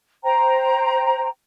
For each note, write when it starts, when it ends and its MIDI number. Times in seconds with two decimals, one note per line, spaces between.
0.24 1.26 72
0.24 1.26 79
0.24 1.26 82